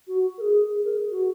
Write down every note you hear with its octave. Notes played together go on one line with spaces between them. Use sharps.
F#4
A#4
G#4
G#4
A#4
G#4
F#4